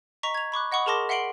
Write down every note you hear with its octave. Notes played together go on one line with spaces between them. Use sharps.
D#5 A#5 C#6 B6 F7
G#6 F7
B5 C#6 D6 F#6
D#5 F#5 B5 C#6 D#6
G#4 A#4 A5 C6 D6 A#6
E5 F#5 C6 C7 D7 F#7